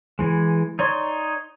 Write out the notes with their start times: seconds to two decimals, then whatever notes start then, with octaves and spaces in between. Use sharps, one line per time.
0.19 E3 G#3
0.79 D#4 C#5 D5 C6